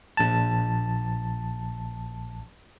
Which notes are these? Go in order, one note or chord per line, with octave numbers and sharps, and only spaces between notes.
A#1 A5